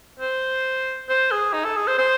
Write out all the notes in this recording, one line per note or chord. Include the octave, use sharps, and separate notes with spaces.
C5
C5
G#4
D#4
A4
G#4
C5
C5